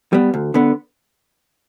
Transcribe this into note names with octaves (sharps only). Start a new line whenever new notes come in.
G3 B3
D2
D3 B3